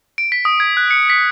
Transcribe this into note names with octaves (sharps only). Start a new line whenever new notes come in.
D7
B6
D#6
G#6
F#6
C#7
B6